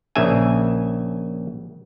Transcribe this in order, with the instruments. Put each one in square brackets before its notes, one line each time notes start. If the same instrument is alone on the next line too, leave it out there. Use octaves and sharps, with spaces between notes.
[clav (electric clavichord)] A#1 C#3 E5 G#5